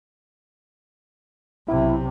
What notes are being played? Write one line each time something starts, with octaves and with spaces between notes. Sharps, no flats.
B1 C3 E4